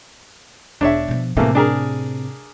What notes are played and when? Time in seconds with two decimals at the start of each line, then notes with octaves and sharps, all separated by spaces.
0.81 E1 D4 C#5 E5
1.08 B2 F3
1.37 A2 C3 E3 A3 A#3
1.55 D4 G#4 A#4